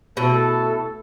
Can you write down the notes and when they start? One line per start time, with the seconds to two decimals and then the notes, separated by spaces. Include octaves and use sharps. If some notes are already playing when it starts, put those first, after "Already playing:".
0.17 B2 A3 E4 A4